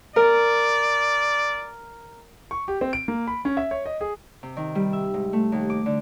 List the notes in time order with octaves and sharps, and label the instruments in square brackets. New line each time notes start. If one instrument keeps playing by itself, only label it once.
[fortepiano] A#4 [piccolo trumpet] D5
[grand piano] C#6
G4
C4
D7
A#3
B5
C#4
E5
C#5
D#5
G#4
[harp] C3
D#3
G3
E5
G#2
A3
D#2
D6
D3